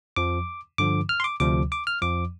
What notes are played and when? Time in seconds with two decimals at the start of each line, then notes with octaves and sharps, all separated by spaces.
0.16 F2 F3 D6
0.78 G2 D3 F3 D6
1.09 F6
1.20 C6
1.24 D6
1.40 D2 C3 F3 D6
1.72 D6
1.87 F6
2.02 F2 F3 D6